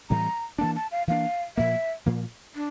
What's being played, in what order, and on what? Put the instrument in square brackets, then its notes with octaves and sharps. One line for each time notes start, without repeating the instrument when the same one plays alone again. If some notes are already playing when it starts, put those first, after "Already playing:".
[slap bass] A2 E3 G3 C4 [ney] A#5
[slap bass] E3 A#3 D4 [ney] A5
[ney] A5
F5
[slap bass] E3 A#3 D4 [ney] F5
[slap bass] A#2 F3 A#3 [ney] E5
[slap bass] A#2 F3 A#3
[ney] D4